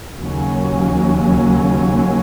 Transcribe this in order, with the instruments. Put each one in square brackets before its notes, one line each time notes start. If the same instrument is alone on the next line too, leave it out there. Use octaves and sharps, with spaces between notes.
[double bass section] D#2 C#3 F#3 A#3 C#4